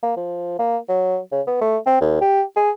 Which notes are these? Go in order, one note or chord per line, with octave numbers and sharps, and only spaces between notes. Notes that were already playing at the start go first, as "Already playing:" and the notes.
A#3
F3
A#3
F#3
C#3
B3
A3
C4
D#2
G4
G#4